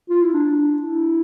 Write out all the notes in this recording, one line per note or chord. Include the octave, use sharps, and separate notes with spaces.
F4
E4
D4
E4